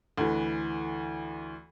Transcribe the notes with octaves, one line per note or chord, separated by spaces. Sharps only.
D2 E3